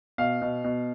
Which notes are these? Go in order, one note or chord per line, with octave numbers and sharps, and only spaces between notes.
B2 F5
B2
B2